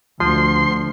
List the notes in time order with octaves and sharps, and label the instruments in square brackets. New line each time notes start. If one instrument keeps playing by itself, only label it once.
[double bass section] D2 [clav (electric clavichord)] F3 [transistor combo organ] C6